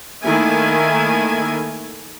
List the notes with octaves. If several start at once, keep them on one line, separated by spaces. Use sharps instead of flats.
D#3 A3 A#3 E4 G#5